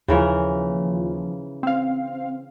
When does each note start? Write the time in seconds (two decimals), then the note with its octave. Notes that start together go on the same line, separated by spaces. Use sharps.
0.08 D#2 C#3 E3 F3 A#4
1.63 C4 F5